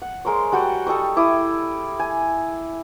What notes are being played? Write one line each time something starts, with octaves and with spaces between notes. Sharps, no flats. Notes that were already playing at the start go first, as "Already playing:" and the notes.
F#5
G#3 A#4 C5 C#5
G3 F#4 F#5 G5
G3 A4 D#5 C#6
E4 D6 D#6
G#5